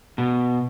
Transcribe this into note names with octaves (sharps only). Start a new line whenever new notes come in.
B2